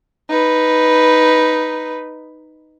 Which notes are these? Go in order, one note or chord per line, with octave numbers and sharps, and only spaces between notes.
D#4 B4